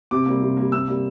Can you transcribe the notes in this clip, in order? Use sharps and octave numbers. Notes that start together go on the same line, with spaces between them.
C3 D6
G3 A#3
C3
G3 A#3
C3 E6
G3 A#3